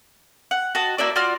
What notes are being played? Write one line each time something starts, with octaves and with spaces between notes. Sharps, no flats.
F#5
F#4 D#5 A5
A#3 E4 F#4 D5
F4 F#4 D5 F6